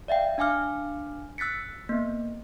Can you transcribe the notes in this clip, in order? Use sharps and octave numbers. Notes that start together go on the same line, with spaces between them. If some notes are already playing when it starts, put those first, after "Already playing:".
D5 E5 F5 G5
D4 F5 G#5 D6 F6
E6 F#6 A6 B6 C#7
A#3 B3